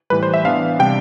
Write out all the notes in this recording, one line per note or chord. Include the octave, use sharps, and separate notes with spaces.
A2 E3 G3 B4
C5
E5
E3 B3 D4 F5
C3 G3 D4 G5